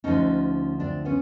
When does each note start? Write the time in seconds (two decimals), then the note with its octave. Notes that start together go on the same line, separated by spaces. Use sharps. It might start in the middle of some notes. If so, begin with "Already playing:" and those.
0.04 D2 D3 F3 C#4 D#4
0.80 C4 D4
1.05 B3 C#4